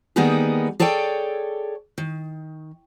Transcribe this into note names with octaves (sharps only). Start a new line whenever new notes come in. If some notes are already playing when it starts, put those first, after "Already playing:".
D#3 G3 A#3 B3 D#4 G#4
G#4 A4 C#5 D5 G5
D#3